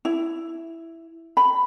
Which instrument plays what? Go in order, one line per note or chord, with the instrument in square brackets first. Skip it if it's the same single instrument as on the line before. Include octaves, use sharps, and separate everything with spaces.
[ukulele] E4
B5